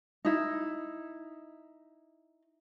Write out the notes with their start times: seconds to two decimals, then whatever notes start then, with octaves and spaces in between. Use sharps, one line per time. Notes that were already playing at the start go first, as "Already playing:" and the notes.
0.25 D#4 E4